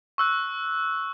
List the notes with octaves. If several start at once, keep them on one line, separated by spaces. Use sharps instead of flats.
C#6 E6 F#6